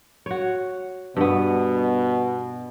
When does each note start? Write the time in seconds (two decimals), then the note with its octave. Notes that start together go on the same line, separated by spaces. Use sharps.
0.26 F#4 C#5
1.17 G2 B2 B3